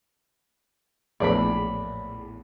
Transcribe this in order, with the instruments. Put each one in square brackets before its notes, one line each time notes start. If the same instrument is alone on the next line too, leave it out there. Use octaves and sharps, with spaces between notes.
[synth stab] A#1 E2 A2 [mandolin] D5 B5